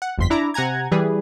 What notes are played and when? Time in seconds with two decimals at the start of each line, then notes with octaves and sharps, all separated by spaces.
0.02 F#5
0.18 G1 F2 C6 B6
0.30 D4 E4 A#5 D6
0.54 C3 F#5 G#5 A#5 G#6
0.92 E3 G3 G#4 B4